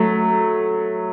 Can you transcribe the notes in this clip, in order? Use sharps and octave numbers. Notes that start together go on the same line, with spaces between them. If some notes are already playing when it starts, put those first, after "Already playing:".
Already playing: F#3 A3